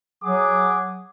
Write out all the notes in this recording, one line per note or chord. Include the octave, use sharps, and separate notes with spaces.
F#3 G#4 F#5 D6